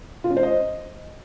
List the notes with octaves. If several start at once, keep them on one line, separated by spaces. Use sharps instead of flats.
F4
C#4
C5
D#5